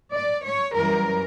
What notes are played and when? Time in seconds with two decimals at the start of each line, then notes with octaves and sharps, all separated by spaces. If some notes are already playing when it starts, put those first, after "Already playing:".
0.12 D5
0.43 C#5
0.74 F#2 E3 G3 A#4